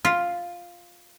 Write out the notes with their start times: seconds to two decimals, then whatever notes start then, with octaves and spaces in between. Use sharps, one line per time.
0.05 F4